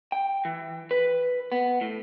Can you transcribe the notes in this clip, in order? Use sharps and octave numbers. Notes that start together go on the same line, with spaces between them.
G5
E3
B4
B3
A2